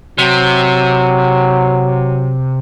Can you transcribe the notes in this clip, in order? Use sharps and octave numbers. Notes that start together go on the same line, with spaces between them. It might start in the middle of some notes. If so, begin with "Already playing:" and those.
C3 F#3